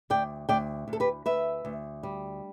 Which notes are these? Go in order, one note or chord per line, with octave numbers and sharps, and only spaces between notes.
D2 D5 G5
D2 D5 G5
D2
A4
G4 B4
D2 B4 E5
D2
G3